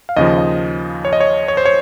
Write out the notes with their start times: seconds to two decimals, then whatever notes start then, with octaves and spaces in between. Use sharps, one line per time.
0.09 F5
0.17 D#2 C#3 F3 D#5
0.38 D#5
1.05 C#5
1.13 D#5
1.20 C#5
1.48 C#5
1.57 C5
1.65 C#5